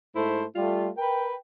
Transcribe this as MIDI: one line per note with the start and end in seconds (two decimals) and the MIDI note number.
0.15 0.44 44
0.15 0.44 57
0.15 0.44 64
0.15 0.44 72
0.56 0.88 55
0.56 0.88 57
0.56 0.88 65
0.97 1.34 70
0.97 1.34 71
0.97 1.34 79